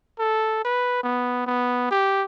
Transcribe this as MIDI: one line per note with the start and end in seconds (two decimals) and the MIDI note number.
0.19 0.61 69
0.65 0.99 71
1.03 1.44 59
1.47 1.88 59
1.91 2.24 67